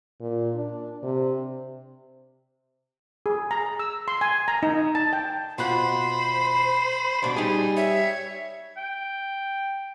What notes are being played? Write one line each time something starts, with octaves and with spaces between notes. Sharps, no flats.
A#2
D4
C3
G#4
A#5
E6
C6
G#5
A#5
D#4
A5
G5
B2 F4 C5 F#5 B5
D2 B2 D4
G3 D#4 G#4
C#5 E5
G5